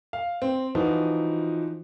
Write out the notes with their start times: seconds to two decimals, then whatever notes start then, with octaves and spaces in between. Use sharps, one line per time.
0.13 F5
0.42 C4
0.75 E3 F3 D#4 F4 F#4